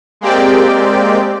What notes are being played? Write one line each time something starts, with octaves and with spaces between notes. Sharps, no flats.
G#3 A#3 C4 G4 D5 G5